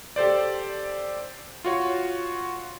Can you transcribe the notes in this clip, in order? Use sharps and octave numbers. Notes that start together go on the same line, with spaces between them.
G4 A4 C5 D5
F4 F#4 C#5